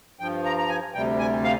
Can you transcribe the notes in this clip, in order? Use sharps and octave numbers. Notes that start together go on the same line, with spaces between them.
G2 F3 G5
A#5
A#5
G#5
D2 C3 G3 G5
G#5
F5